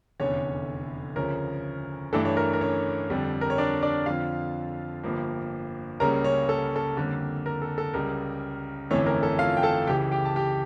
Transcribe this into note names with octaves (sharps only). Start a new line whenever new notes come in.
F1 E2 D3 C#4 C#5
D2 C#3 F3 C#4 A#4
G2 E3 A3 D4 A4
C#5
A#4
A#4
C#4 C#5
F2 D3 G3
A#4
C#5
D4 D5
D4 D5
F2 D3 F3 F4 F5
G1 G2 F3 A#3
C#2 C#3 G3 A#3 C#4 A#4 A#5
C#4 C#5
A4
A4
F2 D3 G3 A#3 C#4
A#4
A4
A4
C#2 C#3 G3 A#4
G1 F2 E3 A3 C#4 C#5
A#4
A4
F4 F5
G5
A4 A5
C#2 C#3 E3 G4 G5
G4 G5
A5
G4 G5